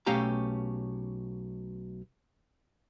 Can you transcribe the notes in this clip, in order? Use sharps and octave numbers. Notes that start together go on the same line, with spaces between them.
B1 A3 C#4 G4 F5 A#5